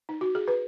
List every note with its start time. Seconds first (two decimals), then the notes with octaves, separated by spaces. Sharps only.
0.09 D#4
0.21 F#4
0.35 G#4
0.48 B4